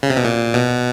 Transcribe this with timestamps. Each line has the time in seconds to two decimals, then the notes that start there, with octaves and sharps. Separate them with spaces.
0.03 C#3
0.10 C3
0.17 B2
0.25 A#2
0.54 B2